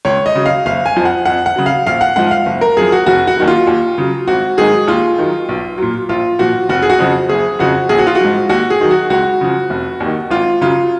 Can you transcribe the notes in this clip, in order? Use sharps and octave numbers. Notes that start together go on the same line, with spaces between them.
C#2 C#5
D#5
C#3 F#3
F5
F#1 F5
G#5
F2 F3
F#5
F2 F#5
F#5
C#3 F#3
F5
A#1 F5
F#5
G#2 F3 F#5
F5
F#1
A#4
F#2 F3 G#4
F#4
F1 F#4
F#4
D#2 D#3 F#3
F4
D#2
C#3 F#3
G#1 F#4
G#2 D#3 F#3 G#4
D#2 F4
D#3 F#3
B1
A#2 F#3
A#1 F4
A#2 F3 F#4
F1 F#4
G#4
F#4
F2 C#3 F3
F#1 G#4
F2 C#3 F3 F#4
A#1 G#4
F#4
F4
F#4
G#2 F3
D#2 F#4
G#4
D#3 F#3
F#4
C#2 F#4
C#3 F3
F1
D#2
D#3
G#1 F4
F#2 C#3 F#3 F4